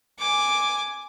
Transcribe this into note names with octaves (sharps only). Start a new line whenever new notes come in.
G#5 D6